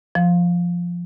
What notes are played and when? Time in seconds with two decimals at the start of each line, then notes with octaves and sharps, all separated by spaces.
0.15 F3